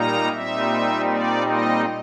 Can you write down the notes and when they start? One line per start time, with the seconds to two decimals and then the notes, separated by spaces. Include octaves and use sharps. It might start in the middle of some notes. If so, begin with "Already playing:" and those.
Already playing: A#2 G3 A#3 D#4 A#5
0.32 A#2 G3 C4 D#4 E5
1.09 D5
1.47 D#5